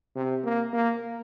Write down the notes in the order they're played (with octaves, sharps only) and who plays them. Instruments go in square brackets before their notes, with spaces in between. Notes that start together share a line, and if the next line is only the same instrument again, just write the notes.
[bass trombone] C3
A#3
A#3